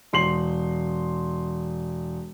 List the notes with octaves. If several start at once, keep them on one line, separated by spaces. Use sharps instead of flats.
E1 C6 C7 F#7